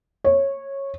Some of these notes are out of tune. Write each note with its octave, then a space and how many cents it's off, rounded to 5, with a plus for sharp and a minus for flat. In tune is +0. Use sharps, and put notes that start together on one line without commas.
C#5 -15